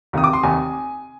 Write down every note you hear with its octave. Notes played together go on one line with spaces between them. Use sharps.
F1 D#2 D#3 D#6
D6
C6
F1 D#2 D#3 G#5